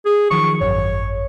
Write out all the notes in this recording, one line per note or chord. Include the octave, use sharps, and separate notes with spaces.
G#4
D#3 F3 F#3 C#6
G#1 F#2 C#5